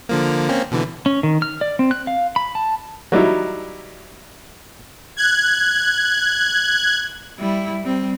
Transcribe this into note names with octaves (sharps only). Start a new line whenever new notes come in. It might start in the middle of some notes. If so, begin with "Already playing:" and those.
D3 F3 A#3
A#3 C4 C#4
B2 D3 E3
C#4
D#3
F6
D5
C4
F#6
F5
B5
A5
F#3 G3 D#4 E4
F#6 G#6
G3 E4
G3 C4